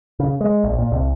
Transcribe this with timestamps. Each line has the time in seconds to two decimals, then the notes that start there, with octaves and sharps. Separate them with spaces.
0.20 C#3
0.41 G#3
0.64 A#1
0.78 A#2
0.92 C2